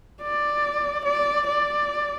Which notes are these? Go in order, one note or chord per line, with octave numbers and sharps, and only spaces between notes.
D5
D5
D5